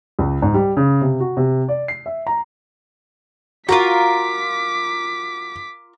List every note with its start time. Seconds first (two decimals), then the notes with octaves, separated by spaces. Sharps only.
0.19 C#2
0.42 G#2
0.54 G3
0.77 C#3
1.02 C3
1.20 F#4
1.37 C3
1.69 D5
1.88 C7
2.06 E5
2.27 A#5
3.69 F4 F#4 A#4 A#5 D6 B6